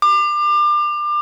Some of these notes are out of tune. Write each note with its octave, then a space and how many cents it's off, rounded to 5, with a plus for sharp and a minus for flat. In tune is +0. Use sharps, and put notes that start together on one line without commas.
D6 +30